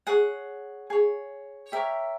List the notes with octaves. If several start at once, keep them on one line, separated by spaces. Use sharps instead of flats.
G#4 C#5 F#5
G#4 C#5
G4 A#4 C#5 E5